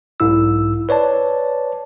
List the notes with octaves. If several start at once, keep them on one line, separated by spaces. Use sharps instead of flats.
B1 G#2 E4 E6
B4 C#5 D5 A5